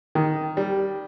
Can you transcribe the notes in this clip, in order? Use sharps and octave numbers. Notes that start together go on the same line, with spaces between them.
D#3
G3